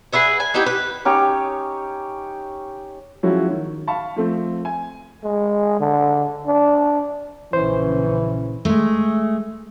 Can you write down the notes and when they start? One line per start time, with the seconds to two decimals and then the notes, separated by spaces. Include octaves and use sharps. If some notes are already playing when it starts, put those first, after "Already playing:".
0.13 G#4 B4 E5 F#5
0.40 G#5
0.54 B3 D#4 E4 G4
0.66 B4
1.05 C#4 D#4 G4 C#5
3.23 F3 F#3 G#3 C#4 E4 F#4
3.51 D#3
3.87 F5 A5 B5 C#6
4.16 F3 A3 C4
4.65 G#5
5.24 G#3
5.80 D3
6.47 D4
7.53 A#1 C#3 E3 C#4 C5
8.65 G#3 A3